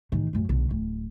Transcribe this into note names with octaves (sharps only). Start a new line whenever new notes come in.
A1 D#3
A1 F#2
B1 D3
D1